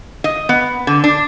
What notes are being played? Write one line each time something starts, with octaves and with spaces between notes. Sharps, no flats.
D#5
B3
D3
D4